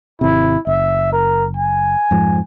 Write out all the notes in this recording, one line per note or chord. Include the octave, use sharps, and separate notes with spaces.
G#1 C3 E4
F#1 E5
A#4
G#5
F2 G#2 F3